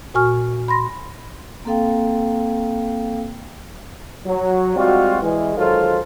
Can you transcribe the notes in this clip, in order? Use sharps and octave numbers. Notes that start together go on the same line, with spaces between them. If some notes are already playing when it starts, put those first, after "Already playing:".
A#2 F#4 G#5 C#6 F6
B5 C6 A#6
A#3 C4 A4 F5 G5
F#3
G3 G#3 C4 F4 F#4
E3 G#3
D#3 F#3 G#3 F4 A4 C5